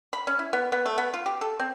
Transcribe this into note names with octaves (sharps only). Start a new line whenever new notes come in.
B5
C#4
E4
B3
B3
A3
B3
F4
G4
A4
C4